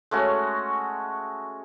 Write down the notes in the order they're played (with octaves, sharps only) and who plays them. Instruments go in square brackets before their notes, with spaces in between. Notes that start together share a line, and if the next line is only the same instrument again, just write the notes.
[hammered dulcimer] G#3 A3 C#4 F#4